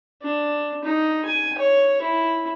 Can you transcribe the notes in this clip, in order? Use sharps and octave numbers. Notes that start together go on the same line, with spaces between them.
D4
D#4
G#5
C#5
E4